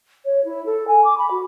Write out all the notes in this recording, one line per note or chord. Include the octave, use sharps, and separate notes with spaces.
C#5
E4
A4
G#5
D6
B5
F#4